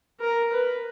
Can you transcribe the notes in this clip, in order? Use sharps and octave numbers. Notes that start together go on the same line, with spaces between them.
A#4
B4